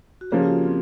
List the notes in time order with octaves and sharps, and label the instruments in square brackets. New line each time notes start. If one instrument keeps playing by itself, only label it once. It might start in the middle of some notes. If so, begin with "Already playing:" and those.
[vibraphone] F#4
[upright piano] C#3 F3 A#3 C#4 [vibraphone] G4
[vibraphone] F4
C4